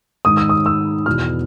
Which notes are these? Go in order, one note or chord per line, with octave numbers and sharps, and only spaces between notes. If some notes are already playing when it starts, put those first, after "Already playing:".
G#2 D#3 D#6
E6
D#6
E6
E2 B2 F6